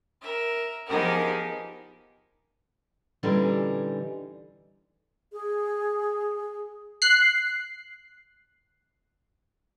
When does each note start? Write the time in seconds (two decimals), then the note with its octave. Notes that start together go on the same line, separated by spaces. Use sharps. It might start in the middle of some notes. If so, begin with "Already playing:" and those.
0.22 A#4 E5
0.88 F3 B3 D#4 G4 G#4 A#4
3.23 A#2 D3 E3 G3 C#4 D#4
5.33 G#4
7.02 F#6 C7